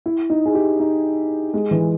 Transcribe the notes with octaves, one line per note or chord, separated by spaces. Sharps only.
E4
D#4
G#4
G4
D#4
G#3
E3